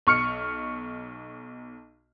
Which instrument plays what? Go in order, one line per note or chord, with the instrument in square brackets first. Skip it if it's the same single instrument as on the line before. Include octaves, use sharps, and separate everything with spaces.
[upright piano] B1 C#6 F6 C#7